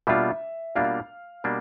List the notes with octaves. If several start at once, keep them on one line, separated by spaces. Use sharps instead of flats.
B2 G3 A#3 D4 F4 E5
B2 G3 A#3 D4 F4 F5
B2 G3 A#3 D4